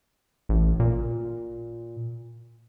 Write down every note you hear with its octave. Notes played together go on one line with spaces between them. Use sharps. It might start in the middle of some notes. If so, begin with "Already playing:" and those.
A1
A#2